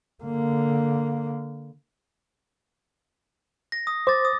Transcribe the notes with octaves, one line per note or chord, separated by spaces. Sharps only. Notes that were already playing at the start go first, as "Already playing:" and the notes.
D3 A#3
A#6
D#6
C5 D6 A6
D#6